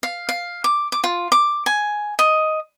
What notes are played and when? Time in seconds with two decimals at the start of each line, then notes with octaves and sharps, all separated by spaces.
0.03 F5
0.29 F5
0.64 D6
0.92 D6
1.04 F4
1.32 D6
1.66 G#5
2.19 D#5